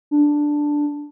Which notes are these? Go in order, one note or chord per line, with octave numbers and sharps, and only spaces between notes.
D4